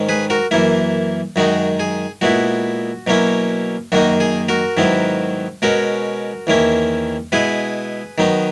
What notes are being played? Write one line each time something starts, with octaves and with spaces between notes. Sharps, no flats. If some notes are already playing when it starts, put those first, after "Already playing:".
Already playing: G#2 D#3 G#3 C#4
G#4 B4
F#4 A#4
F#2 E3 A#3 E4
F#2 D#3 G#3 D#4 F#4
G#4
A#2 G#3 B3 E4 F#4
B2 F#3 A#3 C#4 E4
F#2 D#3 A#3 D#4 F#4
G#4
F#4 A#4
G#2 D#3 F#3 B3 E4
B2 G#3 C#4 F#4 A#4
E2 D#3 A#3 C#4 E4
B2 G#3 B3 E4 G#4 B4
D#3 F#3 B3 D#4